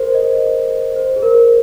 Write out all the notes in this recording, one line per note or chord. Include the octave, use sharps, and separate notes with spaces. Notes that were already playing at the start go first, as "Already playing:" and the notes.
Already playing: G#4 A#4 C5
D#5
C5
G#4
A#4